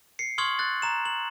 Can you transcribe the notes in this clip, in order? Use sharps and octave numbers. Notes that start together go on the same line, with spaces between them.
C7 C#7
C6 C#6 D#6 F6 G#6 F#7
F#6 A6
A#5 E7
F#7